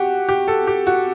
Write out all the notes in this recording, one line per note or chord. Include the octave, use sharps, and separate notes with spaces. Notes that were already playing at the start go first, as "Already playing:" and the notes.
Already playing: F#4 G4
G4
A4
G4
F#4